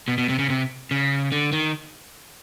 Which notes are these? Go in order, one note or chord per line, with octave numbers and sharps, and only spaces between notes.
B2
B2
C3
C#3
C3
C#3
D3
D#3